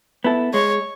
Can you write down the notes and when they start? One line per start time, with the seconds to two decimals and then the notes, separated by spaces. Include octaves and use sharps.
0.24 B3 E4 A4
0.54 G#3 C#5